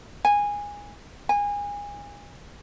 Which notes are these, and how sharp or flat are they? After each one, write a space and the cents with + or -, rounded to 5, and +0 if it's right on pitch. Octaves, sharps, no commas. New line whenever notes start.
G#5 -15
G#5 -30